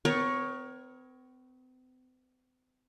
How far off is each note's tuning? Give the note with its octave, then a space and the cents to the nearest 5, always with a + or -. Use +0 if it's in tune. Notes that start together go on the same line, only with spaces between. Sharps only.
C4 -45 A#4 +20 C#5 +0